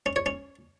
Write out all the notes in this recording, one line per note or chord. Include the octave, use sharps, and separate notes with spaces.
C#4
C#5
C#4